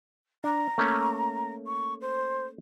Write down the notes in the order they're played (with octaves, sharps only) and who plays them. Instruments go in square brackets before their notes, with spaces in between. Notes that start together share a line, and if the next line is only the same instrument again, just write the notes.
[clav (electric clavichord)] D4 [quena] A#5
[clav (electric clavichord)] A3 A#3 C#4
[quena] C#6
C5